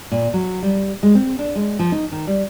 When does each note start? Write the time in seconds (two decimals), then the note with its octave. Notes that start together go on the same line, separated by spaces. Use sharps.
0.11 A#2
0.34 F#3
0.62 G3
1.03 G#3
1.15 C4
1.39 D4
1.55 G#3
1.79 F3
1.92 D#4
2.12 D#3
2.27 G3